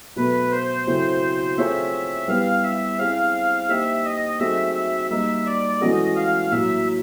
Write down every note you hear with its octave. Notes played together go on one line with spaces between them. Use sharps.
B2 F#3 A3 B4
C5
C#3 F#3 A3 C4 E4
A3 C4 F4 G#4 C#5 E5
G3 B3 E4 G4 B4 F5
E5
C4 E4 G#4 C5 F5
A#3 D#4 G4 C5 E5
D#5
F#3 A3 C4 D#4 G#4 E5
E5
G3 A#3 D#4 E5
D5
E3 G#3 C#4 F#4 A4 D#5
F5
A2 F#3 A#3 E5